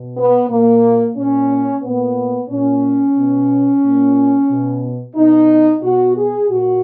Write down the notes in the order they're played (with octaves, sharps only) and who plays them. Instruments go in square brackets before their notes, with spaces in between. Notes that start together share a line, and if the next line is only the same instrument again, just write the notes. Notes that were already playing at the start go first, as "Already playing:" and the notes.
Already playing: [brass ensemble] B2
B3
A#2 A#3
A#2 C#4
A#2 B3
A#2 C#4
B2
A#2
B2
B2 D#4
B2 F#4
G#4
A#2 F#4